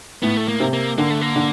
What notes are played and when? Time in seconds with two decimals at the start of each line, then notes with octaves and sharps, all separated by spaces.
0.23 A2 B3
0.37 A3
0.48 A#3
0.60 C3
0.73 A#3
0.98 D3 A#3
1.10 A3
1.21 A#3
1.36 D3